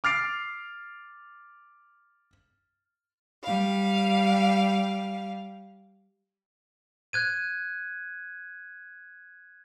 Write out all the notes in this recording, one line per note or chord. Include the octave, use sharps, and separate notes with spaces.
D6 F6 A6 C7 D7
G3 F5
F#6 G#6 D#7